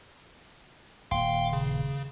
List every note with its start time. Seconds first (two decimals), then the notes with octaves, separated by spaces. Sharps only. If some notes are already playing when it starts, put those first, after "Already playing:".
1.11 D#1 A#3 F5 G5 C6
1.53 C#3